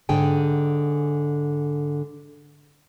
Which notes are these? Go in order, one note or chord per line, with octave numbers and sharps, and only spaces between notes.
G#2 D3 G#4 G5 G#5